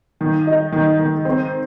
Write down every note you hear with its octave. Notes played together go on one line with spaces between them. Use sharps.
D#3
D#4
D#3
D#3
C4